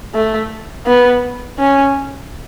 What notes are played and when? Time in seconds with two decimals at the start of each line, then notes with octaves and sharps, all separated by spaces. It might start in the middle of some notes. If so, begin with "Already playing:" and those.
0.14 A3
0.86 B3
1.59 C#4